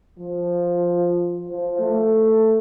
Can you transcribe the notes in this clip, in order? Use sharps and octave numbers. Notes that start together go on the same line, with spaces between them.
F3
F3
A3